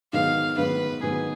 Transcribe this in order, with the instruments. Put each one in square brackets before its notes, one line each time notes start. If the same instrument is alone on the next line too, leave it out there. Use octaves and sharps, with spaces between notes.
[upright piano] G#2 D#3 F#3 B3 [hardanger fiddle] F5
[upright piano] G#2 D#3 F#3 B3 [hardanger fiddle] B4
[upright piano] G#2 D#3 F#3 B3 [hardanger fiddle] G#4